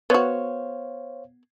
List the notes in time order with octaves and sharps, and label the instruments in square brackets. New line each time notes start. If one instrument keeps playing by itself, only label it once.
[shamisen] B3 F#4 [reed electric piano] C5 C#5 F5